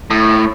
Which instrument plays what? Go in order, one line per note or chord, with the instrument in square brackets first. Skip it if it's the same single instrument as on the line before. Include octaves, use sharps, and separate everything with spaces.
[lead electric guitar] A2